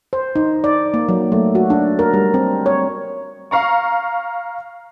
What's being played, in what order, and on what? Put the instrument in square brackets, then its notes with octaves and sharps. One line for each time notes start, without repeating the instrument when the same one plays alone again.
[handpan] C5
D#4
D5
A#3
F#3
A3
F#4
D4
A#4
G3
C4
C#5
[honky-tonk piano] F5 A#5 C#6